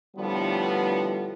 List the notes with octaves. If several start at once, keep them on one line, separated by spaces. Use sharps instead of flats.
A2 D3 F3 G3 B3